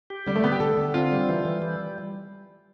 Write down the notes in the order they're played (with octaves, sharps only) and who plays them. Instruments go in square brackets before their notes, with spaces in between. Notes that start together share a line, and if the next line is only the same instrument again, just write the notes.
[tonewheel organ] G4
[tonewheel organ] D3 [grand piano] G3
[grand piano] A3
[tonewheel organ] D3 [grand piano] B3
[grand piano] G4
[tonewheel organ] D3 [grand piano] A4
[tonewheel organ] D3
[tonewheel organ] C4 [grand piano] F4
[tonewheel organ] G3
E3
E3
G3